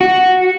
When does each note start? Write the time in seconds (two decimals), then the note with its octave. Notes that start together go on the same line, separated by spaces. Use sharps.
0.01 F#4